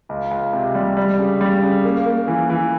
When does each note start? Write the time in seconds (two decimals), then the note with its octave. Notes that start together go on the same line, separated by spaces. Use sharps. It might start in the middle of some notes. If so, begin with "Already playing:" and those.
0.09 C#2
0.31 C#2
0.53 C3
0.75 G3
0.97 G3
1.18 C#3
1.41 G3
1.62 C#3
1.85 A#3
2.06 A#3
2.28 E3
2.50 E3